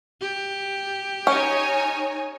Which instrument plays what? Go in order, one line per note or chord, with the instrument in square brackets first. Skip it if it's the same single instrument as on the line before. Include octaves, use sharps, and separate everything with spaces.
[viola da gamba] G4
[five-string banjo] C#4 [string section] D#4 C#5 G#5